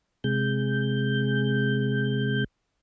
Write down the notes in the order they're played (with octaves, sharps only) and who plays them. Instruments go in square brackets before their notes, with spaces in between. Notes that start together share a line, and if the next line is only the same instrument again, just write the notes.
[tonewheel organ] C3 G#3 G6